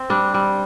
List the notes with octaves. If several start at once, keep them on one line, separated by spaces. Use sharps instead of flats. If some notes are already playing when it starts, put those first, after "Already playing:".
Already playing: C4
G3 D4
G3